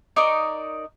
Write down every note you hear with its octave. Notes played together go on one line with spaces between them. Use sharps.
D#4 A#4 D5 C#6